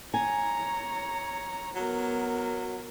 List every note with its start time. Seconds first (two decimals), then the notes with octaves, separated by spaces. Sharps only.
0.14 C#5 G#5 A#5
1.75 F#3 B3 A#4